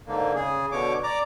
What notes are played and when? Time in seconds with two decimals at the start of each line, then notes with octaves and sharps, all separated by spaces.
0.07 G#2 D3 A#3
0.35 C#3 G#4
0.72 B2 D3 C#5 D6
1.04 D5 A#5 D6